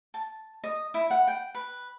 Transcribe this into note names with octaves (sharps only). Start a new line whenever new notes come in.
A5
D#5
E4
F#5
G5
B4